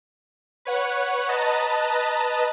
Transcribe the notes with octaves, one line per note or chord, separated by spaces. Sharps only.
B4 C#5 F#5
B4 D#5 A5 A#5